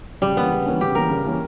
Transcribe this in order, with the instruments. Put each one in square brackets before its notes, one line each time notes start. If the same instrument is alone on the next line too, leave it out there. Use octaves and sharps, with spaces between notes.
[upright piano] C#3 [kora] G3
[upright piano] E3 A#3 C#4 [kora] B3
[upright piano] C#3
E3 A#3 C#4
[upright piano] C#3 [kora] G4
[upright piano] E3 A#3 C#4 [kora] A#4
[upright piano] C#3
E3 A#3 C#4